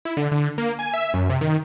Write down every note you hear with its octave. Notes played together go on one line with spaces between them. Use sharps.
E4
D3
D3
A#3
G#5
E5
F#2
C3
D#3